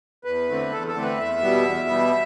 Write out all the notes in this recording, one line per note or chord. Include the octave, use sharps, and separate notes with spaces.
E2 B4
D3 A3 C4
E2 A4
A4
D3 A3 C4
B4
E2 E5
B2 G3 B3
E2
B2 G3 B3